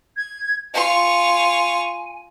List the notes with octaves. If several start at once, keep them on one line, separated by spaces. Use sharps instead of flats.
G#6
F4 G#5 C#6